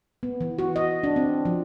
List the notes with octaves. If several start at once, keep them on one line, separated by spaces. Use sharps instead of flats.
B3
E3
F#4
D#5
D4
C4
F3